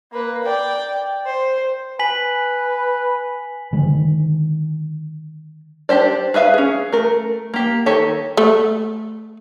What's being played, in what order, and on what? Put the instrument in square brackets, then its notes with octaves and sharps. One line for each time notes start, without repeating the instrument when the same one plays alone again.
[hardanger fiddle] A#3 B4
D5 G5
C5
[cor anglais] B4 [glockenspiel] G#5 B6 F#7
[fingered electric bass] D3 D#3 G#3
[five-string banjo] D4 G4 C5 D5
G#4 B4 E5 F5
C#4 G#4
A3 A#4
A#3 G4
D#3 G4 A4 C#5
[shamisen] A3